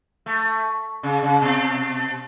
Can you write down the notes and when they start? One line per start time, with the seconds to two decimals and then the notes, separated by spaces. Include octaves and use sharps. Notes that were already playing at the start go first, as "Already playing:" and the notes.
0.26 A3
1.03 C#3
1.23 C#3
1.42 B2